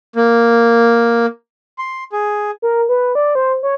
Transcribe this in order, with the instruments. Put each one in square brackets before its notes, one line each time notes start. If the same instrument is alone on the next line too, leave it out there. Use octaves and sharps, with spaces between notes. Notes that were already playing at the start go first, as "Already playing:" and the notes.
[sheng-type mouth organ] A#3
C6
G#4
[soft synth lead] A#4
B4
D5
C5
C#5